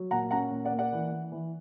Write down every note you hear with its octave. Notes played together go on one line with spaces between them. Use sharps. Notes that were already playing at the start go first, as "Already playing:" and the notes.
Already playing: F#3
A#2 F#5 A#5
C#4 F#5 A#5
A#2
D5 F#5
A#3
D5 F#5
E3
E3
E3